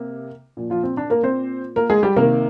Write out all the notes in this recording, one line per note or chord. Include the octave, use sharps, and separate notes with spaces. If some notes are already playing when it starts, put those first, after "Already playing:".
Already playing: C3 A#3
A#2 F3
F3 F4
C4
D4
A#3 A#4
C4 C5
A#3 A#4
G#3 G#4
G3 G4
C3 D#3 A#3 A#4